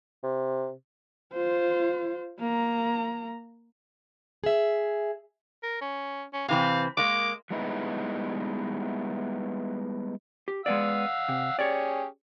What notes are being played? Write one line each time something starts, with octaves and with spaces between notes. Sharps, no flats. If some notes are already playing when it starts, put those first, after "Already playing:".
C3
F4 C5
A#3 A#5
G#4 E5
A#4
C#4
C#4
C3 E3 C4 F5
G#3 A#3 D6
G3 G#3 B3 D#4 E4
G4
G#3 B3 D5 F5 F#5 E6
C3
C#4 G4 G#4 C#5 D5